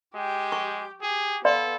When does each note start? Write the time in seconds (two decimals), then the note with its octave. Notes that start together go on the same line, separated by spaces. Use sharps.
0.15 G#3 G4 G5
0.52 C#6
1.01 G4 G#4
1.45 B3 A4 D5 F5 C6